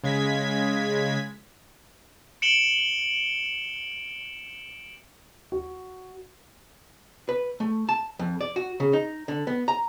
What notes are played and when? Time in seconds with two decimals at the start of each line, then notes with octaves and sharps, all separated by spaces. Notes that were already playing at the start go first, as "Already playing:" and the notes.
0.04 C#3 G#3 G#6 B6
2.42 C#7 D7 E7 F#7 G7
5.52 F#4
7.29 B4
7.60 A3
7.89 A5
8.19 F2
8.41 D5
8.56 F#4
8.80 C#3
8.93 D#4
9.28 D3
9.47 B3
9.68 A#5